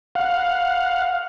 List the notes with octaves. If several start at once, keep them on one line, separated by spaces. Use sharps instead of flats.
F5 F#5